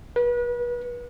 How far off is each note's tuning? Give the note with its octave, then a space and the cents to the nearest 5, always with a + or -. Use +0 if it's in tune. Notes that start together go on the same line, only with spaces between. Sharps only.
B4 -35